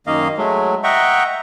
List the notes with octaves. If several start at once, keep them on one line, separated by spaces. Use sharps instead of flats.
F#2 D#3 A#3 D#5 F5
F#3 G#3 A3
D#5 E5 F#5 G5 A#5 C#6